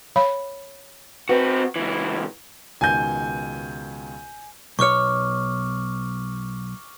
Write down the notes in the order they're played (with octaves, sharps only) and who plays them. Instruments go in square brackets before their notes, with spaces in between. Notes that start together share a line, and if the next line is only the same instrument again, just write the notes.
[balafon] C#5 F5 B5
[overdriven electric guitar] C4 F#4 [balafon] B4
[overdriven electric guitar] C#2 E3
[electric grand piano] C#2 B2 D#3 [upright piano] G#5 G6
[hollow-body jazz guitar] B1 C#5 [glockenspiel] C#6 D6 F6